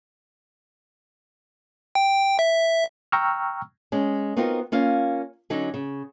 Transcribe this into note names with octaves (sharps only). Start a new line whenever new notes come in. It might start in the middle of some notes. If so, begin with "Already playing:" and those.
G5
E5
G5 A#5 C#6 E6 F6
G#3 C#4
B3 C4 D#4 F4 F#4 A#4
A#3 C#4 F4 F5
D3 F#3 C#4 D#4
C#3